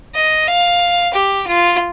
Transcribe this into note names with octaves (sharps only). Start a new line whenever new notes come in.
D#5
F5
G4
F4